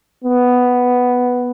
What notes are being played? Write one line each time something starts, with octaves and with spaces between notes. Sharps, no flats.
B3